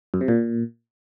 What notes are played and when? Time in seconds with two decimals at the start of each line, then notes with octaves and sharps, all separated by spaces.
0.14 F#2
0.21 C3
0.28 A#2